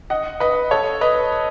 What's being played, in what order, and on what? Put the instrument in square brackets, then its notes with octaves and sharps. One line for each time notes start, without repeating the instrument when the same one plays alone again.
[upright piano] D#5 F#5
B4 D#5
A4 C#5
B4 D#5